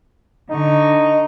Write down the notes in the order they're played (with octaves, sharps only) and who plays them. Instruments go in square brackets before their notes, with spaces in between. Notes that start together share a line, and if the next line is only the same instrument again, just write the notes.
[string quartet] D3 C#6 [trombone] D#4